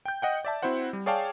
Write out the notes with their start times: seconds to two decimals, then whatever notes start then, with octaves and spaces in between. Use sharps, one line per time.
0.06 G5 G6
0.22 D#5 F#5 G5
0.45 D5 E5 A5
0.62 C4 E4 F#4 C5 F#5
0.93 G3
1.06 G#4 C#5 D5 F5 G5 A5